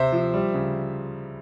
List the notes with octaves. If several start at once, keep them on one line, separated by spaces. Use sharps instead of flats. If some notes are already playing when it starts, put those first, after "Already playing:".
Already playing: C3 C5 E5
F3
G3
C#3